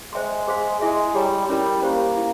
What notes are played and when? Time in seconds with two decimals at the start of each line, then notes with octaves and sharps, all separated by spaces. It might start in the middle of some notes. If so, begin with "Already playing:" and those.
0.13 G#3 C5 E5 G5 C6
0.48 G#4 C5 F5 C6
0.81 G#3 E4 G#4 E5 G#5
1.15 G3 G4 C#5 G5 A#5
1.49 G3 C#4 E4 A#4
1.83 A#3 C#4 G4 C5
2.17 E4